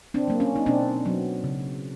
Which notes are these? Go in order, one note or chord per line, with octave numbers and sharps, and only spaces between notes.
C4 D4
F#3 A#3
C#4
D#4
B2 C4 D4
F#3 B3
C#3